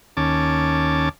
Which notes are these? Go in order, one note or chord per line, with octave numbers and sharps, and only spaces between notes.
D#2 C#4 A5 D6